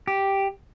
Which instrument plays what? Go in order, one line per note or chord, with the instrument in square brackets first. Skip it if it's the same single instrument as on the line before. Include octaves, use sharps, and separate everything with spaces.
[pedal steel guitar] G4